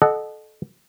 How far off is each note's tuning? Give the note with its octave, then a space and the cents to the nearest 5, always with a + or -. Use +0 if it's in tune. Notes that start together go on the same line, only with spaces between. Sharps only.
A4 -20 D#5 -35 F#5 +0